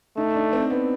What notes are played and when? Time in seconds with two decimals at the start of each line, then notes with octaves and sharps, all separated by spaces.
0.17 A3 D#4
0.34 D4
0.53 C4
0.70 B3